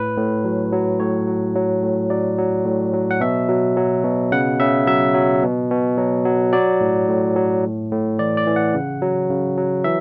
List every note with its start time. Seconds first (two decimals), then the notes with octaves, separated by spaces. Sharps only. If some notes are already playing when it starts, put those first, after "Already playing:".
Already playing: A2 B4
0.17 A2
0.45 F#3
0.73 F#3
1.00 A2 C#5
1.28 F#3
1.56 F#3
1.83 A2
2.10 F#3 D5
2.38 F#3
2.66 A2
2.94 F#3
3.11 F#5
3.21 B2 E5
3.49 F#3
3.77 F#3
4.04 B2
4.32 C#3 F#5
4.60 C#3 E5
4.87 F#3 E5
5.14 F#3
5.43 B2
5.70 B2
5.98 F#3
6.25 F#3
6.53 F#3 D5
6.81 A2
7.08 A2
7.36 F#3
7.64 A2
7.91 A2
8.19 E3 D5
8.37 D5
8.47 E3
8.56 F#5
8.74 C#3
9.02 F#3
9.30 C#3
9.57 F#3
9.84 E3 E5